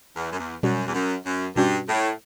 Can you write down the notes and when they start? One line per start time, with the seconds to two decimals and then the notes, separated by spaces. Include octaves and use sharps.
0.16 E2
0.32 F#2
0.39 E2
0.63 F#2 B2 G3 C#4 F#4
0.87 E2
0.94 F#2
1.25 F#2
1.56 G2 B2 G3 C#4 F#4
1.88 A2